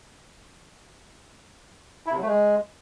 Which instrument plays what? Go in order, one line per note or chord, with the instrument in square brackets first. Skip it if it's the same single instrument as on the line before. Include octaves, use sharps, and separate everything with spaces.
[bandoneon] E4
C3
F#3
A3
G#3